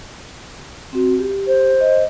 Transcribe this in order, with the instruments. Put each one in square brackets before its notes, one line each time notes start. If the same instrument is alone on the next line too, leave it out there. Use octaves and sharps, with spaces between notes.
[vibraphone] C4 F#4
G4
[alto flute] C5
[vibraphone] D#5